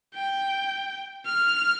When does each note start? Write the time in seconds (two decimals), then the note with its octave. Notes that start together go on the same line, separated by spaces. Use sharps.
0.15 G5
1.26 F6